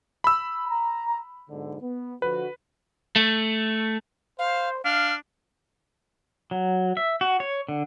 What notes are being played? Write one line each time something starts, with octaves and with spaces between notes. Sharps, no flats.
B5 E6
A#5
B1 G#2 D3
B3
D3 F3 F#4 B4
A3
C5 F5
D4 F5 F6
F#3
E5
F#4
C#5
D3